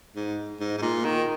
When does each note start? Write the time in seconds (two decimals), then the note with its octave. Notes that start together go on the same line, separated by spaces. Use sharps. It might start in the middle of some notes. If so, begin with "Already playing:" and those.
0.16 G#2
0.60 G#2
0.78 G#2
0.82 A#2
1.05 D#3